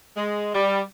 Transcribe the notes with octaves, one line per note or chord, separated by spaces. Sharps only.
G#3
G3